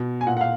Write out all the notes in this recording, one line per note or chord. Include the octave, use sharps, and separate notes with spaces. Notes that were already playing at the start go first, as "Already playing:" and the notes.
Already playing: B2
G#5
A#2 F#5
F#5
F5